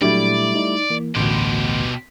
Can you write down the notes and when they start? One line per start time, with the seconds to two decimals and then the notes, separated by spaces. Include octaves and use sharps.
0.02 A#2 F#3 G3 A3 D4 E4 D5
0.55 D#4
0.90 E3 A#3
1.16 A1 D2 B2 G4 C6